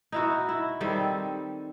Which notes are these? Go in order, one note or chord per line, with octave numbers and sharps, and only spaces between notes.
D#4 E4 F#4
E4
D#3 G3 C4 A4